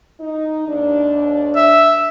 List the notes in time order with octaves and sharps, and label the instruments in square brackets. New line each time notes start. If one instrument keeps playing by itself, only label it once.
[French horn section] D#4
D#2 D4
[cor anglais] E5